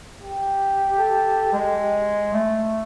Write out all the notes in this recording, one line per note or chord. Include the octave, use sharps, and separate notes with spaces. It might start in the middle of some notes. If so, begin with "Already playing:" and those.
G4
A4
G#3
A3